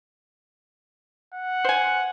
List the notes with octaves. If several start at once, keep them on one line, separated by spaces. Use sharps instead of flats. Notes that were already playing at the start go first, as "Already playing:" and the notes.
F#5
C5 G#5